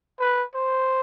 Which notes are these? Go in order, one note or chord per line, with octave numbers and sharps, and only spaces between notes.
B4
C5